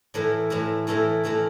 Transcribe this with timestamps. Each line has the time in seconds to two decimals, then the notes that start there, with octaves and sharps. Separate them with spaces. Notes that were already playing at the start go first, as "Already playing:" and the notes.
0.14 A2 E3 A3 E4 A#4
0.50 A2 E3 A3 E4 A#4
0.87 A2 E3 A3 E4 A#4
1.24 A2 E3 A3 E4 A#4